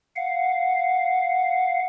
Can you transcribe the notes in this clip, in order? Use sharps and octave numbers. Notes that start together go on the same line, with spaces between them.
F5 F#5